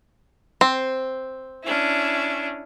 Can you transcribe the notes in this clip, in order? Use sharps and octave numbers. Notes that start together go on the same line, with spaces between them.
C4
C#4 D4 E4